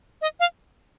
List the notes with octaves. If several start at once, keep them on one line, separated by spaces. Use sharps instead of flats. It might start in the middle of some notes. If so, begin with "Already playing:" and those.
D#5
F5